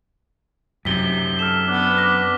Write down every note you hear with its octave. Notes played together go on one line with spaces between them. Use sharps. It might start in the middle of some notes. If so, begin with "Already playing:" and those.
F#2 C3 B6 G7
A4 F6 E7
B3 D4
D6 A#6 B6